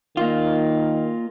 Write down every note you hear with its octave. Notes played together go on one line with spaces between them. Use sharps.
D#3 A#3 F4